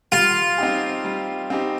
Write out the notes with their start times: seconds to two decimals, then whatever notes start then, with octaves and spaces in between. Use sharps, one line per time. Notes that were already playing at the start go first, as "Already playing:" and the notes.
0.12 G3 F4
0.58 C4 D#4 G4
1.05 G3
1.50 C4 D#4 G4